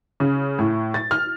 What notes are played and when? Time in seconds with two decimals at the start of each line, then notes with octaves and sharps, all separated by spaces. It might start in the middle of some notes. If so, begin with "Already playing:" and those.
0.20 C#3
0.59 A2
0.94 A6
1.11 F6